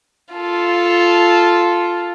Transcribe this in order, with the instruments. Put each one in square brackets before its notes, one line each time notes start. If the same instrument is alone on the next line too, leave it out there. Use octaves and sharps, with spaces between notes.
[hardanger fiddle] F4 A4